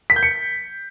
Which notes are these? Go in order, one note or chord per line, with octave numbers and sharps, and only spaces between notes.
B6
G6
C#7